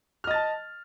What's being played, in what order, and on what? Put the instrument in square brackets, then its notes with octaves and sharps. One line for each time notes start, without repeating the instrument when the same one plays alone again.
[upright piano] F6
D#5
A6
A5